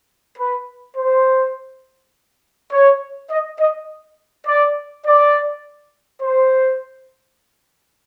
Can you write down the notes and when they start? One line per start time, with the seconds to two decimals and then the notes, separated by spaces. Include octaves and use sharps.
0.39 B4
0.97 C5
2.72 C#5
3.31 D#5
3.60 D#5
4.47 D5
5.06 D5
6.22 C5